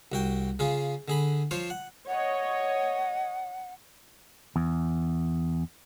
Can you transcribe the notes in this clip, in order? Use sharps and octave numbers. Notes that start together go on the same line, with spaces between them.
C2 F#4 G5
C#3 F4 G#4
D3 G#4 B5
F3 F4 C5 C#5
F#5
C#5 D#5 F#5
E2